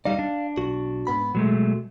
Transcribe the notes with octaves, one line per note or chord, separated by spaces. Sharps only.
G3 D#4 D5 F5
D4
B1 F#4
G#2 B3 B5
B2 F#3 G#3 A3